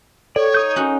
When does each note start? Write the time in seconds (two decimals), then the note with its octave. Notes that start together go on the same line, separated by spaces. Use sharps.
0.36 A4 C#5 D5
0.54 D#4 D#6 G6
0.76 C#4 F#4 F#5